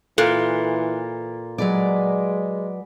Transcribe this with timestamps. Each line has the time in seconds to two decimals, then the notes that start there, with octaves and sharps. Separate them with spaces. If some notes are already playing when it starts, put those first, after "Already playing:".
0.18 A#2 E3 A4
1.58 F#3 G#3 B4 D5